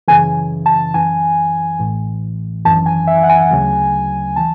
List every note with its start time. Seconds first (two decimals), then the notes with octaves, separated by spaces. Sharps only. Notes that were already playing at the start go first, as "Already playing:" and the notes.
0.08 F#2 C#3 E3 G#5
0.66 A5
0.94 F#2 E3 G#5
1.79 A1 A2 E3
2.65 G#1 F#2 E3 A5
2.86 G#5
3.07 E5
3.23 F#5
3.29 G#5
3.51 D2 C#3 F#3
4.36 E3 A5